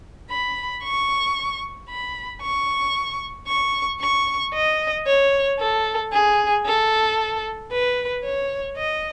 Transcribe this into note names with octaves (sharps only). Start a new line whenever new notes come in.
B5
C#6
B5
C#6
C#6
C#6
D#5
C#5
A4
G#4
A4
B4
C#5
D#5